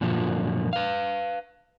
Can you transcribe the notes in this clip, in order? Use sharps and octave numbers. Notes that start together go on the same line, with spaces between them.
F#2 A#2 D3 F3 F#3
B4 F5